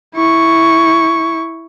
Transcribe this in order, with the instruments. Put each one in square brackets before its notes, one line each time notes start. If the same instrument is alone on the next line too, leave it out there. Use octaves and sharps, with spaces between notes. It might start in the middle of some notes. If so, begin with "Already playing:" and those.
[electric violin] E4 C#6